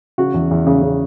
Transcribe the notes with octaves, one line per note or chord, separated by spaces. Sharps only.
C#3 F#4
E2
E2
C#3
C#3